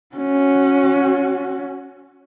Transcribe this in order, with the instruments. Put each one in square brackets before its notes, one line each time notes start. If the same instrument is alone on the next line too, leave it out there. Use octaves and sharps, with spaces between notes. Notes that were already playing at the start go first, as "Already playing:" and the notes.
[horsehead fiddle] C#4 F#4